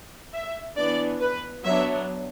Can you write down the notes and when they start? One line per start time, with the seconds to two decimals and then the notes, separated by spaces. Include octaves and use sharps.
0.33 E5
0.77 E3 B3 D4 D5
1.21 B4
1.64 F#3 B3 D4 E5